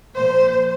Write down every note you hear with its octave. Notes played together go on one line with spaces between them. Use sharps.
A#2 F3 C5